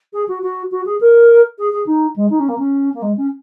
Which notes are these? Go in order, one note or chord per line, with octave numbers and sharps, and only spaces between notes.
G#4
F#4
F#4
F#4
G#4
A#4
G#4
G#4
D#4
G#3
D#4
C#4
A#3
C#4
A#3
G#3
C#4